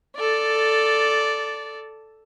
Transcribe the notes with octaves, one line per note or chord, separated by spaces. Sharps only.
A4 D5